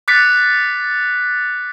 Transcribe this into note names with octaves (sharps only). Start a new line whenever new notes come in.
D6 F#6 A6 B6 C#7